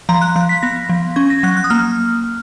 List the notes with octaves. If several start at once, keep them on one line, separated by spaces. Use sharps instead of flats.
F3 A#5
F#6
F3 F#6
B6
B3 A#6
F3
C#4 G#6
A#6
F#3 F#6
F#6
D#6
A#3 F6